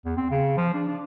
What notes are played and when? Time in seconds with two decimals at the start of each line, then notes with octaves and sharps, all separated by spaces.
0.05 E2
0.17 C4
0.31 C#3
0.57 F3
0.74 D4
0.88 D4